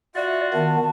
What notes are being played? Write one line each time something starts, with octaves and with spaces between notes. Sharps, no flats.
F4 F#4 D5 E5
D#3 B3 A5